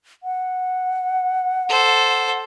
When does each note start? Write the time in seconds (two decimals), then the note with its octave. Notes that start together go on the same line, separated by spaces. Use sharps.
0.23 F#5
1.69 A4 C5